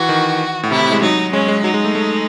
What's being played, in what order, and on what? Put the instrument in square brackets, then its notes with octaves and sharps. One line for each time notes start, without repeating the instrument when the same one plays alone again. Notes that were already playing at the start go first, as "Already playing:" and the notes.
Already playing: [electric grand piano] E3 [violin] F#4
[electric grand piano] D#3
A2
[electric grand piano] C3 [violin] E4
[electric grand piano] C3
G#3
[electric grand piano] F#3 [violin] D#4
[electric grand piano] G#3 [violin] C#4
[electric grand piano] G#3
[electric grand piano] F#3 [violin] D#4
[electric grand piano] G#3
A3
A3